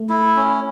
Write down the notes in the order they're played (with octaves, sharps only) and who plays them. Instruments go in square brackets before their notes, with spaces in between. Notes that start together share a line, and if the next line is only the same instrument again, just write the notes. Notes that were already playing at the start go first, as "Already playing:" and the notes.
Already playing: [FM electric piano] A3
[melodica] E4
C#4